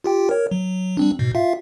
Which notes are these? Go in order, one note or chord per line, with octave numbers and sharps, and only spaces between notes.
F4 G4 G5
A#4 C#5
F#3
G3 C4 D4
G#2 B2
F4 E5 F5